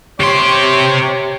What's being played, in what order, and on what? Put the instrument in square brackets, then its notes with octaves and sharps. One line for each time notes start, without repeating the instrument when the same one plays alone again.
[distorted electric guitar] C3 C6 [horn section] G4 C#5